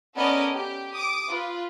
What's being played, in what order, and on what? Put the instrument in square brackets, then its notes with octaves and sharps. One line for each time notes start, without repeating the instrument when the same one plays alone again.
[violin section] B3 C#4 A4 A#4 D5 D#5
G4
D6 D#6
F4 B4